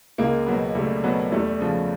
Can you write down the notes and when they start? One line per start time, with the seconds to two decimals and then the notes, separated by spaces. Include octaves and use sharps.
0.18 C#2 G#3 A#3
0.47 B2 F#3 B3
0.75 C#2 G3 A3
1.04 B2 F#3 B3
1.32 E2 G3 A3
1.60 C#3 F3